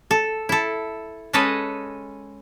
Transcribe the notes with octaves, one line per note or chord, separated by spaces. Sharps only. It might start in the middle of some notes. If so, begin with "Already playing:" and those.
A4
E4 A4
G#3 C#4 A4 B4 D#5